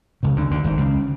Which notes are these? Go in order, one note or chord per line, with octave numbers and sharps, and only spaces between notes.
C#2 C#3
D2 D3
D2 D3
G#1 G#2
C#2 C#3